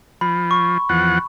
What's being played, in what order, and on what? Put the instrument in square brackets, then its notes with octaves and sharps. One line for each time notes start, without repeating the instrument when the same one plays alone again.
[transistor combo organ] F3 [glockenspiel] B5
[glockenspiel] C#6
[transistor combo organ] E2 F3 F#5